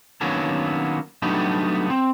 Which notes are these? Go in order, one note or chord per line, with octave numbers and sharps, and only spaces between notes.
D#3 F#3 A#3 B3 C#4 D4
F#3 G3 A3 B3 D4 D#4
C4